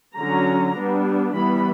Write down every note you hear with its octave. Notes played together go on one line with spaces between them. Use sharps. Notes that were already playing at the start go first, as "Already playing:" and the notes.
D3 F#3 C#4 A#5
G3 B3 D4
E3 G3 B3 B5